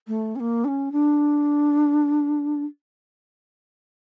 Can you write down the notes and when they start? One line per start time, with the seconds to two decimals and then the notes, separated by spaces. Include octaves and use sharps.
0.07 A3
0.35 C#4
0.40 A#3
0.64 D4
0.67 C#4
0.92 D4